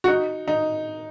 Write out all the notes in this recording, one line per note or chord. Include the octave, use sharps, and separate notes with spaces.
F#4
D#4
D#4